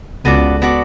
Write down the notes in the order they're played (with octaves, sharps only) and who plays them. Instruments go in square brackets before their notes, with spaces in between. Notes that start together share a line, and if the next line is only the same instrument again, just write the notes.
[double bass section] C#2 C#3 [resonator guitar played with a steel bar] B3 F#4 A4 D5
[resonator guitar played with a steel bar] B3 F#4 A4 D5